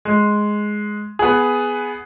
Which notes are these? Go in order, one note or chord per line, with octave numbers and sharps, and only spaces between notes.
G#3
B3 G#4